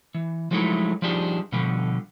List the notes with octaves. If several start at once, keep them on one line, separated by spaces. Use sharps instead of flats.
E3
F3 F#3 G#3 A3 D#4 E4
F3 G3 D4 D#4 G4 G#4
B2 D3 F3 G3